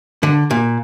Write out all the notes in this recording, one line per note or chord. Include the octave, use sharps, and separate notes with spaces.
D3
A#2